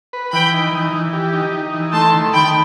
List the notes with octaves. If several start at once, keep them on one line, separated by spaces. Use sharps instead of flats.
B4
E3 G5 B5
D#4
E3
E3
G4
D#4
D#4
E3
A3 A5 C6
D#3
D#3 G5 B5